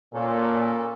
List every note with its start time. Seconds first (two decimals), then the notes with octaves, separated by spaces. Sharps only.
0.14 A#2 A#3 C#4 A4